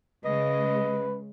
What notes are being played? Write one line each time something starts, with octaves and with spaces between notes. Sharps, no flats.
C#3 G#3 B4 D#5